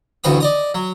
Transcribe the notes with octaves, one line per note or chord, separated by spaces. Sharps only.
A1 D2 G2 F#4 B5 D#6
D5 D#5 D#6
F#3